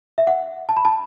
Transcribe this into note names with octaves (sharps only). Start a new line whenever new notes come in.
E5
F#5
A5
B5
A5